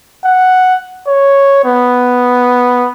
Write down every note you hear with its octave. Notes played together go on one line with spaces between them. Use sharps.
F#5
C#5
B3